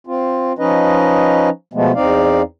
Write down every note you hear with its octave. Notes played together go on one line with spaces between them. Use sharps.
C4 F4
F3 C#4 D#4 B4 D#5
B2 F3 G#3 A3 B3
E2 C4 D#4 D5 F5